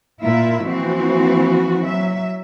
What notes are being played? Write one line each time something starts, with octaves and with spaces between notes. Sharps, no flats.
A#2 E4 F4 A#4 E5
E3 F3 A#3 C4 F#4
F#3 E5